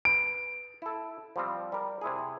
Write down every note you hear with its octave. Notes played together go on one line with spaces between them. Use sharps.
B4 D7
E4 A4
F3 G3 C4
G3 A#4
C3 E4 G#4